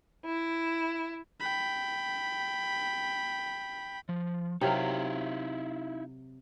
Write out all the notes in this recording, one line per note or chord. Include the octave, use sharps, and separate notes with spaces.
E4
G5 B5
F3
C3 F#3 D#4 E4 A#4 F5